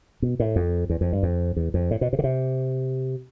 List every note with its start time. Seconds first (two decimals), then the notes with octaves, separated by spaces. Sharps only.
0.22 B2
0.40 A2
0.56 F2
0.90 E2
1.01 F2
1.13 G2
1.23 F2
1.56 E2
1.74 F2
1.91 A2
2.01 B2
2.13 C3
2.19 D3
2.24 C3